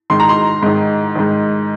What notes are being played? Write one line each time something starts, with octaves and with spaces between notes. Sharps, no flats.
G#2 D#3 C6
A#5
C6
G#2 D#3
G#2 D#3